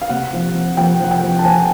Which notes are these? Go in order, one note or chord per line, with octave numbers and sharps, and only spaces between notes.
F5
C3 F#5
F3
F3
F3 G5
F3 F#5
G5
F3
A5
F3 G#5